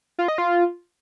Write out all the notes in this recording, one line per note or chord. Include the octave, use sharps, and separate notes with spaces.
F4
D#5
F4